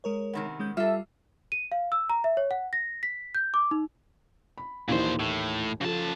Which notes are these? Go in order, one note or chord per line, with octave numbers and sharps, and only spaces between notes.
G#3 A#4 C#5
C3 D#3 B3
G#3 C#4 G6
G3 F4 A4 E5 F6
D#7
F5
E6
A#5
E5
C#5
F#5
A#6
B6
G6
D6
D#4
B5
D#2 A#2 E3 D#4 C5
A2
C#3 F3 A4 A5